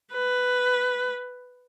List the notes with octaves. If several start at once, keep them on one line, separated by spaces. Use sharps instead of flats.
B4